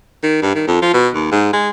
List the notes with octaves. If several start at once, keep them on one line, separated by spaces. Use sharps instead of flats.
D#3
G2
D#3
F2
F3
B2
D#2
G#2
G#3